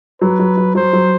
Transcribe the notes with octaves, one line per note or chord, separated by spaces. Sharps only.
F#3 B4
F#3
F#3
F#3 C5
F#3